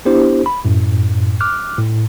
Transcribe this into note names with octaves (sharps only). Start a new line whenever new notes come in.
B3 D4 E4 G4 C5
B5
F#2 A2
D6 F6 F#6
A2